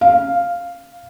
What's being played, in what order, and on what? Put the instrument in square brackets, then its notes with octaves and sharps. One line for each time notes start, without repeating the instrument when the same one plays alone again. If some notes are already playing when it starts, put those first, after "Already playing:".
[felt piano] F5